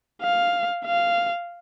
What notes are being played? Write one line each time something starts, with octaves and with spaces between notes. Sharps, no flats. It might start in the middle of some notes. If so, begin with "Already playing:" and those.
F5
F5